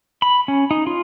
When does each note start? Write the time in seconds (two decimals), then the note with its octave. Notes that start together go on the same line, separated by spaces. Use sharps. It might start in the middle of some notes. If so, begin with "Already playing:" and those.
0.22 B5
0.48 C#4
0.71 D#4
0.87 F4